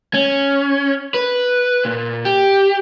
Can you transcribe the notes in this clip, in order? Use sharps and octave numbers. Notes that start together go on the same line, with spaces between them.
C#4
B4
A#2
G4